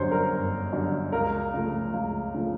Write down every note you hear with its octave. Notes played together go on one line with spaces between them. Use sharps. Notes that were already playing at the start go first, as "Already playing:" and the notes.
Already playing: G1 F#2 D3 G3 C5 C#5
A#4
G1
F#2 D3 G3
C#2 A#4
C#3 F3 A3
C#2
C#3 F3 A3